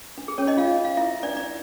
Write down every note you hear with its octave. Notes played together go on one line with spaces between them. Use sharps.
D4
G#4
C#4 C#5
D#4 D#5
F4 F5
F5
E4 E5
D4 D5
D4 D5